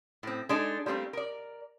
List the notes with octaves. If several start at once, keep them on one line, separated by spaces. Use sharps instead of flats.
A2 C4
G#3 D4 D#4 A4
G3 A3 A#3 C4 D4
A#4 D5